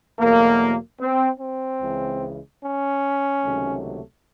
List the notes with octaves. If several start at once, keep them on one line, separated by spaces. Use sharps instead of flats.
E2 B2 F#3 A3 A#3
C4
C4
C#2 C#3 E3 G#3
C#4
C#2 C3 D#3 F#3 A3